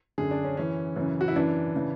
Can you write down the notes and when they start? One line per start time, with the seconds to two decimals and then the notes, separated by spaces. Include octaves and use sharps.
0.18 F#2 D3 G#4
0.31 D4
0.45 C#4
0.57 F#2 E3 C#4
0.96 F#2 C#3 E3
1.21 F#4
1.28 E4
1.36 F#2 E3 D4
1.76 C#3 E3